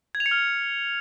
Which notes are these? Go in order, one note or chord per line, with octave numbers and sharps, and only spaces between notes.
G#6
F7
C#7
F6